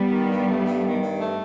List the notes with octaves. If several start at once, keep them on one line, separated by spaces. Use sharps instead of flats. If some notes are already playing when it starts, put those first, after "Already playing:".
Already playing: G3 B3
D#3
G2
A3
G2
D#3
G2
A3